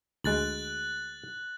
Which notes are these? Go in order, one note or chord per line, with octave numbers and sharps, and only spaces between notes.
D2 G#3 F#6 A6 F#7